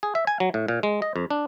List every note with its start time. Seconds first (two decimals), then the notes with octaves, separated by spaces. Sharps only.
0.03 G#4
0.15 E5
0.27 G#5
0.40 F#3
0.54 A2
0.68 A#2
0.83 G#3
1.02 D#5
1.16 F2
1.30 D4